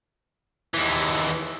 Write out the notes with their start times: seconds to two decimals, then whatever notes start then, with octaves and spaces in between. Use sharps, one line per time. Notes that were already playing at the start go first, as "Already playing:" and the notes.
0.74 D#2 E3